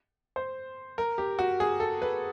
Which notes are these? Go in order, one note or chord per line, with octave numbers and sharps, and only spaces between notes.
C5
A#4
G4
F#4
G#4
A4
B4